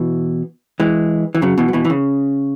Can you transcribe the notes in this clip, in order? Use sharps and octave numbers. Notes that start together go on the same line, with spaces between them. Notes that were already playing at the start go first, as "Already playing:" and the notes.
Already playing: B2 E3
E3 G#3
E3
C#3 F#3
B2 E3
F#3
B2 E3
E3
C#3